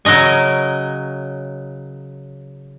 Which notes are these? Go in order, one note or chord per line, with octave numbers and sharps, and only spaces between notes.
C#3 F#3 A#4 D#5 G#5